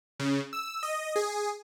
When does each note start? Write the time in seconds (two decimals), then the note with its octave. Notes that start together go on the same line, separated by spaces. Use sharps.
0.20 C#3
0.53 E6
0.83 D#5
1.16 G#4